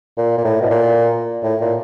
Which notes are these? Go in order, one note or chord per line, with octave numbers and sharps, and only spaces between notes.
A#2
A#2
A2
B2
A#2
A2
A#2